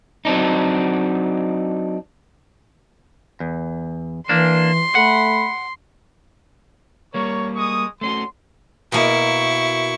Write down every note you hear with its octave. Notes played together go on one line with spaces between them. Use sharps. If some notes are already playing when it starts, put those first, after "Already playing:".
F#3 C4 D4 D#4
E2
E3 A#3 D4 C6
A3 F#5 B5
G3 A#3 A#4 C#5 C#6
G#3 C#6 D#6
A3 C#4 F#4 C6
B2 A#3 E4 C#6